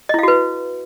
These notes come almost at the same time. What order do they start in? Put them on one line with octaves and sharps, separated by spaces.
D#5 E4 F5 F#4 B4